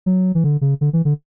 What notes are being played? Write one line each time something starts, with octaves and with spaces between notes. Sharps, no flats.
F#3
E3
D3
C#3
D3
E3
D3